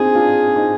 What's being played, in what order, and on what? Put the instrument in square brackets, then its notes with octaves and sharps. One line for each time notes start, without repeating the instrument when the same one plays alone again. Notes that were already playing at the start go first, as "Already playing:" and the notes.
Already playing: [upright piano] C4 D4 D#4 F4 [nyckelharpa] G#4
[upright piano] D4 F4
C4 D#4